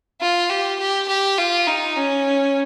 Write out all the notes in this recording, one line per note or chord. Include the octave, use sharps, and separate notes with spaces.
F4
G4
G4
G4
F4
D#4
C#4